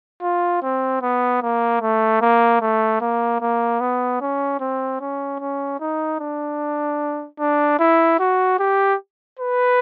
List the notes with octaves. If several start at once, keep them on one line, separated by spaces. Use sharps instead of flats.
F4
C4
B3
A#3
A3
A#3
A3
A#3
A#3
B3
C#4
C4
C#4
C#4
D#4
D4
D4
E4
F#4
G4
B4